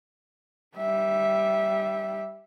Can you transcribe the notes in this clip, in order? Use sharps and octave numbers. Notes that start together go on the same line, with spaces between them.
G3 E5